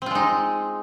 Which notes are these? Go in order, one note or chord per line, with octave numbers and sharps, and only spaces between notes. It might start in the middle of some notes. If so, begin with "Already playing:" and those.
G#3 C4 D#4 F4